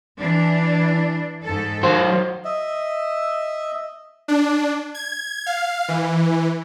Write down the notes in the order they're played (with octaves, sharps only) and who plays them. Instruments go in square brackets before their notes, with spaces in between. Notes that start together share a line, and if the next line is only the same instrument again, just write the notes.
[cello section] E3 D4
G#2 A4
[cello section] D#3 [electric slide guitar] F#3 C5
[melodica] D#5 E5
[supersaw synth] D4
G#6
F5
E3